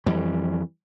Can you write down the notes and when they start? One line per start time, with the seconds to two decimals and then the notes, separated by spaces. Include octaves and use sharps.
0.06 F2 E3 G3